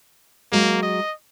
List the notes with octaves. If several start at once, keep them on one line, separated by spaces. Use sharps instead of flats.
F#3 G#3 A#3
D#5